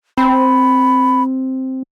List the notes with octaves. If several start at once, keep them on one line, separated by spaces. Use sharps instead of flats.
C4 B5